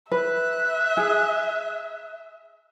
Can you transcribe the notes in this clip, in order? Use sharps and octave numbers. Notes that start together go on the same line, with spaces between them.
B4 E5 F#6
G#4